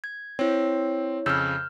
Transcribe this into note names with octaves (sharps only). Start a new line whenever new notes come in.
G#6
C4 E4 C#5
F2 C#3 E6 F6 G6